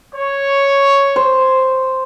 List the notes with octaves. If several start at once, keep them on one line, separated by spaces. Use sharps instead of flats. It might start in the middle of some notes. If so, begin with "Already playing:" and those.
C#5
C5